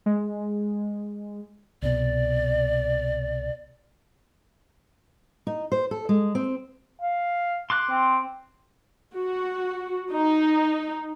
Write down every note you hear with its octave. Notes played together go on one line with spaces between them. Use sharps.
G#3
C2 B2 D5
D#4
C5
A4
G#3
C4
F5
C6 D6 F#6
C4
F#4
D#4